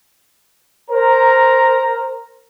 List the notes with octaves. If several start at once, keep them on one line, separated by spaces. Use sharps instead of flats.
A#4 C5 A#5